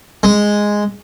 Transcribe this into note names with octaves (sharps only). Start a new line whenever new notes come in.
G#3